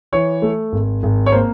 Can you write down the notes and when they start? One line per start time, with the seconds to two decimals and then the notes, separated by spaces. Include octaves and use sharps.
0.12 E3 C#5
0.42 A3
0.73 G#1
1.03 G#1
1.26 C#5
1.32 A#3 C5